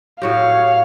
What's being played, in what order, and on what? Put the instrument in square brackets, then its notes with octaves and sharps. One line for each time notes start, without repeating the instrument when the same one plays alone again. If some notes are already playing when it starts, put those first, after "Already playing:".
[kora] A2 F#4 G4 [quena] C#5 [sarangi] F5